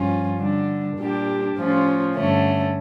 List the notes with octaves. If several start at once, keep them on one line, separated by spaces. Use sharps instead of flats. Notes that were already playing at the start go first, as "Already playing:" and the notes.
Already playing: G2 F3 C#4 F4
D3 G3 D4
A#2 G3 D4 G4
A2 F3 C#4 F4
G2 D3 A3 C#4